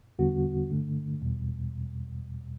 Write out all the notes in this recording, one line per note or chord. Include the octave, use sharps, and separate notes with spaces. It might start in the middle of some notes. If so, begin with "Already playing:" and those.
E2 D3 G3 B3 F#4
G2 D3 A3
E2 B2 G3